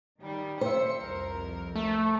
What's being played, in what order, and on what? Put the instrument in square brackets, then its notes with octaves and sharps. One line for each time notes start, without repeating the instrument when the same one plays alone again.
[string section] D#3 G3
[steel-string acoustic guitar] C5 E5 [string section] C#7
[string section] C2 F2 A#4
[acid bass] A3